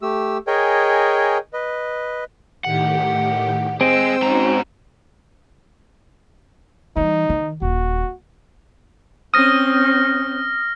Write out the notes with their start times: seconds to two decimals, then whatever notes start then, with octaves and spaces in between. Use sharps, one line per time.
0.02 A3 G4 E6
0.47 G#4 A#4 C#5 D#5 G5 G#5
1.53 B4 D#5
2.65 A2 D#3 G4 F#5
3.81 C4 G#4 C5 D#5 E6
4.22 G#2 C#4 D#4 F#4 A#5
6.96 E3 G3 D#4
7.30 D#3
7.62 D#1 F#4
9.34 C4 C#4 D#6 F6 A#6